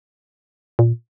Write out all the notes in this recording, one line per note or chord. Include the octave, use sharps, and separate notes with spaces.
A#2